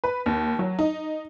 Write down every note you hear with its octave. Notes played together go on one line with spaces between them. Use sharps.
B4
D#2
F#3
D#4